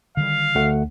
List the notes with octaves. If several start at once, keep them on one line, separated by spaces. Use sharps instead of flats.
D3 D#3 G3 F5
D2 A3 F#5